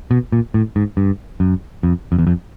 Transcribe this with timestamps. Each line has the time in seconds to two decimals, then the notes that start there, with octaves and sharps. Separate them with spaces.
0.11 B2
0.32 A#2
0.54 A2
0.76 G#2
0.97 G2
1.40 F#2
1.83 F2
2.12 F2
2.19 E2
2.27 F2